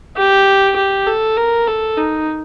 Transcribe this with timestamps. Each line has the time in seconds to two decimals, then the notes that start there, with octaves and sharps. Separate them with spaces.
0.17 G4
0.76 G4
1.07 A4
1.37 A#4
1.68 A4
1.97 D#4